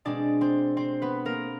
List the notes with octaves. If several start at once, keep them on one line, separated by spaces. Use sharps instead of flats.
B2 G#3 C4 D4 D5
C4 C5
C4 C5
B3 B4
A#3 A#4